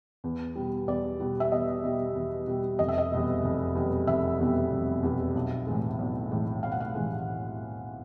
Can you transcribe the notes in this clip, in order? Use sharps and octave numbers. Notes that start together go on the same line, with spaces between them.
E2
B2 G3
E2 D5
B2 G3
E5
E2 D#5
B2 G3
E2
B2 G3
F1 D#5
E5
D#5
E2 B2 G3
F1
E2 B2 G3
F1 E5
E2 B2 G3
F1
E2 B2 G3
B1
A2 E3 G#3
B1
A2 E3 G#3
B1 F5
F#5
F5
A2 E3 G#3